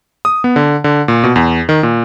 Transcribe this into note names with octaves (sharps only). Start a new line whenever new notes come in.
D#6
B3
D3
D3
A#2
B2
E2
D#3
A#2